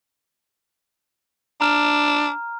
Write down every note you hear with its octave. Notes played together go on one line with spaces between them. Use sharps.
D4 A#5 F6